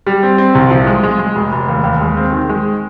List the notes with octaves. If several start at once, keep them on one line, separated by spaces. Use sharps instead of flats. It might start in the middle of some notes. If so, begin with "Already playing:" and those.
G3
C4
C4
C2
F3
G#3
G#3
G#3
F1
F1
D#2
D#2
G#3
C4
D#3
G#3